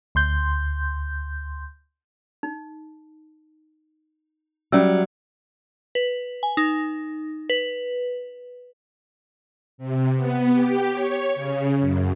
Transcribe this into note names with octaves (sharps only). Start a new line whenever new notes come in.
D2 C6 G6
D#4
F#3 G3 C#4 E5 E6
B4
G#5
D#4
B4
C3
B3
G4
C#5
C#3
F#2